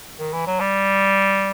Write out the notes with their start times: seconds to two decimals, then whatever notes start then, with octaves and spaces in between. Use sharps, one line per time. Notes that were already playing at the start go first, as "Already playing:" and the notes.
0.19 D#3
0.33 E3
0.47 F#3
0.60 G3